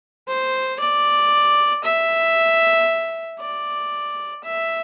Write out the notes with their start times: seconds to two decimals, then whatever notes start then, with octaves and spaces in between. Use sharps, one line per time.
0.28 C5
0.80 D5
1.84 E5
3.40 D5
4.44 E5